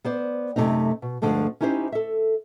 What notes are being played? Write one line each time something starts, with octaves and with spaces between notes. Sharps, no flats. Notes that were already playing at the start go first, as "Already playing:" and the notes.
B3 C5 D5
F#2 C3 A3 C4 D#4
B2
D2 G2 D3 F3 G#3 A3
C#4 D#4 E4 G4 B4 C5
A4 E5